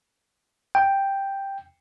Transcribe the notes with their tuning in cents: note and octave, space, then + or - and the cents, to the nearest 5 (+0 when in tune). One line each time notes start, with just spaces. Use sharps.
G5 +5